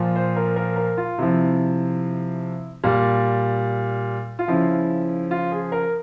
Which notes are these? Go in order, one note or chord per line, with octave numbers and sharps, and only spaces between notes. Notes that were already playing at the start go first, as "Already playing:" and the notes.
Already playing: A#2 F3
C5
A#4
A#4
A#4
F4
C3 F3 E4
A#2 G3
F4
C#3 F3 E4
F4
G#4
A#4